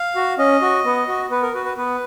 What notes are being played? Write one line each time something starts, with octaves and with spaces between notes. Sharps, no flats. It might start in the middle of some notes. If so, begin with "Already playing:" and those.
Already playing: F5
F#4
C#4 D#5
F#4
B3
F#4
B3 B4
A#4
F#4 B4
B4
B3 B4